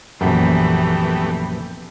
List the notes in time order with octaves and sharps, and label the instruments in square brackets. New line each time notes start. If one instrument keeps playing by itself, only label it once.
[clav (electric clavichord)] A#1 F#2 [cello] E3 [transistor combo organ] A3 B3 G4